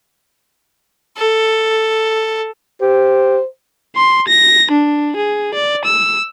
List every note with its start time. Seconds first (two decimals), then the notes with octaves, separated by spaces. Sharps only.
1.17 A4
2.81 G4 C5
3.96 C6
4.28 A#6
4.71 D4
5.16 G#4
5.54 D5
5.85 E6